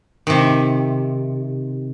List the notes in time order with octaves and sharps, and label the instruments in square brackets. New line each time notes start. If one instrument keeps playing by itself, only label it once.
[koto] C3 D#3